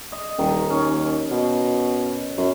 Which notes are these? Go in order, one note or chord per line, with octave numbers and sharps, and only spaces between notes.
D#5
D#1 D#3
D#2 C#4
B2
F#2